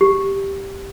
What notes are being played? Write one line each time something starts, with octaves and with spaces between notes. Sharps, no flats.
G4